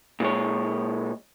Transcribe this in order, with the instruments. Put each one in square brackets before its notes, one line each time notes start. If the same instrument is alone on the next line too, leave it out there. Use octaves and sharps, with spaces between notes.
[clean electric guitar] A#2 G#3 C#5